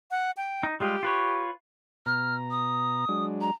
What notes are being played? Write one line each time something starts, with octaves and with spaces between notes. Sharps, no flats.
F#5
G5
D#4
G3 G#3 F4 G4
F4 B4 C#5
B2 A#5 F6
D#6
F#3 G#3 D4
A#5